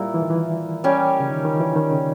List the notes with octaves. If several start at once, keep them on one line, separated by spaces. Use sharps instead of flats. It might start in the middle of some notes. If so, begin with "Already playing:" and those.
Already playing: A#2 G3 A#3 E4 A#4
E3
D#3
E3
G3 C#4 G4
C#3
D#3
D#3
E3
D#3
C#3